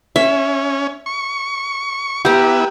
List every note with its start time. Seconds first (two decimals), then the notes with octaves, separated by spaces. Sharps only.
0.16 C#4 E5
1.06 C#6
2.25 B3 E4 G4 A#5